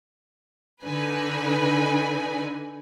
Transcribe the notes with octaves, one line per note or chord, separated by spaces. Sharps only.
D3 D#4 B4 G#5